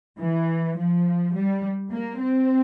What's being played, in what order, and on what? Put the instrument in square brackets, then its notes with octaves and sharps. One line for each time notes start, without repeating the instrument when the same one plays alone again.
[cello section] E3
F3
G3
A#3
C4